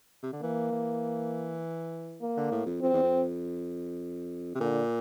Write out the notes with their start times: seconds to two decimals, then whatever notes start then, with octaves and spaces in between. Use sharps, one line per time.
0.23 C3
0.33 D3
0.42 E3 A#3
0.72 E3
2.21 A#3
2.37 D3
2.51 A2
2.66 F2
2.81 F2 C4
2.93 E2
3.03 F2
4.55 C3
4.60 A#2 D3